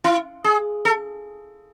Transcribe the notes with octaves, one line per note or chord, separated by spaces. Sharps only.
E4
G#4
A4